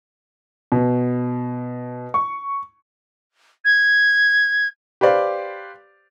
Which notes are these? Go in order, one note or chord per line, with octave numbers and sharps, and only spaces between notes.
B2
C#6
G#6
G4 B4 C5 D5 F5